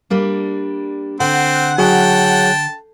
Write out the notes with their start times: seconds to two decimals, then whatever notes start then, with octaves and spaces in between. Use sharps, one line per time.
0.10 G3 A#3 D4
1.20 D3 C4 F#5
1.78 F#3 G#4 C#5 G5 A5